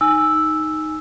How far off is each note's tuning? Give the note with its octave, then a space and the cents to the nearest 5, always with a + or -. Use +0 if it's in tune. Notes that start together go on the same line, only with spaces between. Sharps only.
D#4 +0 G#5 +0 E6 +0